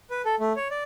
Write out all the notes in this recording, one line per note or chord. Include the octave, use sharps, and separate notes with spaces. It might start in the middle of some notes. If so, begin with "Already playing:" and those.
B4
A4
A3
C#5
D5